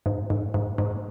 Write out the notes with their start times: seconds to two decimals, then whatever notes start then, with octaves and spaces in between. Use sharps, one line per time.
0.06 G#2
0.30 G#2
0.54 G#2
0.78 G#2